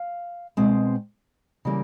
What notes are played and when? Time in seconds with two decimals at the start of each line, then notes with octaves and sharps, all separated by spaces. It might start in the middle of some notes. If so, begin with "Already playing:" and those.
Already playing: F5
0.57 B2 G#3 C4
1.65 C#3 E3 G3 A#3